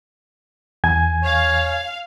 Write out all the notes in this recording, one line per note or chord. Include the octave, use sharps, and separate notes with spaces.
E2 G#5 G#6
C#5 F5